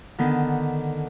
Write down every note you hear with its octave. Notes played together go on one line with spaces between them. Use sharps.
D3 D#3 B3